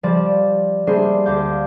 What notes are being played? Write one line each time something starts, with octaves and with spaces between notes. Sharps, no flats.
F3 G3 D5 E7
G3 A3 A#3 D4 G#4 C5
D2 F5 D6 G6